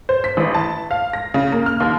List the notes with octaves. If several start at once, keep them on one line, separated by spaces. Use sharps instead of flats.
C5
B6
A1
A5
F5
A#6
C#3
A#3
F6
D#2